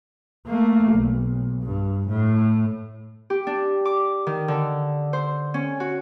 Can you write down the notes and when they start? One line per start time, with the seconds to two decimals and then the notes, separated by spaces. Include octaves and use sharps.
0.47 A3 A#3
0.93 B1
1.63 G2
2.09 A2
3.30 G4
3.47 D4
3.85 D6
4.27 D#3
4.48 D3
5.13 C5
5.54 C#4
5.80 F#4